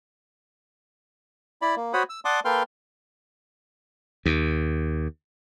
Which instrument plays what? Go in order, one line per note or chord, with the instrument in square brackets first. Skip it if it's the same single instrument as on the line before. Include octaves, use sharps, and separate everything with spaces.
[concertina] E4 D5 B5
A#3
F#4 C5 C#5 F#5 B5 D#6
E6
D5 F#5 A5 C6 D6 D#6
A#3 A4 B4 G5 C6 F6
[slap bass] D#2